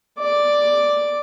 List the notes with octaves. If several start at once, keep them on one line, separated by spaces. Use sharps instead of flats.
D5 D6